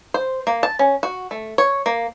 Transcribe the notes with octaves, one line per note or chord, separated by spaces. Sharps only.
C5
A#3
A5
C#4
F#4
A3
C#5
A#3